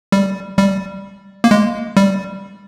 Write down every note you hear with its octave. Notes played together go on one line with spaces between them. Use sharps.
G3
G3
A#3
G#3
G3